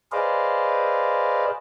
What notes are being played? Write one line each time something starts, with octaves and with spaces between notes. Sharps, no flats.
G#4 B4 C5 D5 D#5 F5